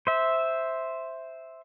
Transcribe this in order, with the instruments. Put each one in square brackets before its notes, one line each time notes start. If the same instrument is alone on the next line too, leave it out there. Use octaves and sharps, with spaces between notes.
[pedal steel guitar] C5 E5